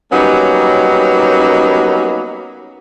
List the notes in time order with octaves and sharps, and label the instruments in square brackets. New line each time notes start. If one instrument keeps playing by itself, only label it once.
[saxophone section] F#3 G3 A#3 B3 C#4 D#4